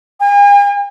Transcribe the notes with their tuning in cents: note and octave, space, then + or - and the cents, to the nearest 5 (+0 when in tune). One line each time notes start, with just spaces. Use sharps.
G#5 -45